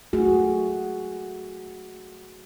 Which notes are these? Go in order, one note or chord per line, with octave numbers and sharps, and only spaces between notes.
A3 F#4 G#4